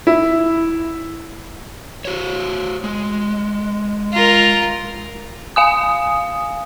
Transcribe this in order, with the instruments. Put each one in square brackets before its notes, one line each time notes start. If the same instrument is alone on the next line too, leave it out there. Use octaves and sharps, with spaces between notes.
[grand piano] E4
[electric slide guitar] F#4 C5 C#5
G#3
[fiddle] F4 A#4
[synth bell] F5 G#5 D#6